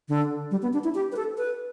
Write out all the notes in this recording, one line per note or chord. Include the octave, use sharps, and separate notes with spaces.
D3
G3
B3
D4
E4
G4
B4
A4
B4